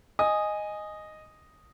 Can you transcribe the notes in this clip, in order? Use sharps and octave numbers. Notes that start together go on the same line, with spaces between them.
D#5 G#5 D#6